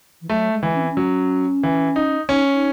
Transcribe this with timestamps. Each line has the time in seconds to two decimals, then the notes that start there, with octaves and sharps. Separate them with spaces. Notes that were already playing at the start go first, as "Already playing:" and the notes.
0.21 E3
0.30 F#3 A3
0.52 G#3
0.63 E3
0.75 C#4
0.82 C4
0.90 C#4
0.97 F#3
1.63 E3
1.96 D#4
2.29 C#4 D#4
2.53 D#4